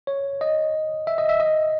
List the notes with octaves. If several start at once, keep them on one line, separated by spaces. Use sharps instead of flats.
C#5
D#5
E5
D#5
E5
D#5